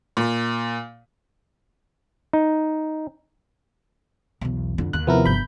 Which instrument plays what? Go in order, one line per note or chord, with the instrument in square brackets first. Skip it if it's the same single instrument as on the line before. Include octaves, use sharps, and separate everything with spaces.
[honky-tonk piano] A#2
[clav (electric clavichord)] D#4
[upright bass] B1 E2
F2 D3
[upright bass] D#2 [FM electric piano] F#6
[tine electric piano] C3 F3 [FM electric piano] B3 E4 A#4
[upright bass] G1 [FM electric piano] B5 G6